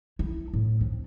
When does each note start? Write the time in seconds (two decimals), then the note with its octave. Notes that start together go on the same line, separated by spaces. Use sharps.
0.19 E4
0.53 A2
0.81 C4 D4